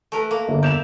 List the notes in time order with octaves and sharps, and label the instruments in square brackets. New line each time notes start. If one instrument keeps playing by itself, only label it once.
[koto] A3 A#4 B4
A#3
[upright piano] G1
[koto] D5 E5 [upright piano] G6 E7 F7